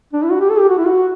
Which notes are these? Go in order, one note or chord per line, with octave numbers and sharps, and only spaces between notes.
D4
E4
F#4
G4
A4
G4
F#4
E4
F#4